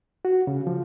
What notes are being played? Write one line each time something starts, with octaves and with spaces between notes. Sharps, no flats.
F#4
C#3
F3